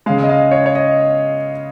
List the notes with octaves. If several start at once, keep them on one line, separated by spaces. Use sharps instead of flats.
C#3 G#3 F5
D#5
F5
C#5
C#5
D#5